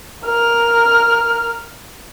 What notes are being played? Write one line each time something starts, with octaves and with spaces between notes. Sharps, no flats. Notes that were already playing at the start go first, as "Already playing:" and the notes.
A#4 F6